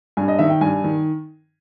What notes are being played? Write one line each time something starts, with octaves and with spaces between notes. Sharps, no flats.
G2 G#5
D#5
D#3 E5
G5
G2 G#5
D#3